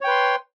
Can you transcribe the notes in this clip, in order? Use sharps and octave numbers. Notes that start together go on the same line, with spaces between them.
B4 C#5 G5 C6